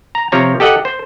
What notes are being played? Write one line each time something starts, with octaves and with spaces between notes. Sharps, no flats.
A#5
C3 F3 C#5 A#5
G4 A4 D#5 F#5
C5